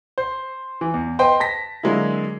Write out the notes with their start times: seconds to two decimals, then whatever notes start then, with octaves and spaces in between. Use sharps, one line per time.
0.18 C5
0.81 E3
0.94 E2
1.19 B4 C5 D#5 G5 C6
1.40 A5 A#6 B6
1.83 D3 F#3 G#3 A#3 E4